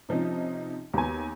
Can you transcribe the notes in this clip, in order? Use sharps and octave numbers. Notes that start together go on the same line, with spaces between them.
C3 F3 C#4 D#4
D#2 B3 G#5